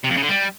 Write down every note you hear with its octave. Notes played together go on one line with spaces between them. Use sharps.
C3
F2
C#3
D3
G3